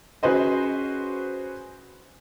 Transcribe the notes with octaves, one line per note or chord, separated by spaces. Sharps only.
C#4 F#4 G#4 B4 C5 D#5